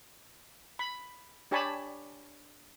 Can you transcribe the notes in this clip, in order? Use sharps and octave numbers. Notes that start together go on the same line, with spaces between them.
B5
D4 G4 C#5 G#5 A5 B5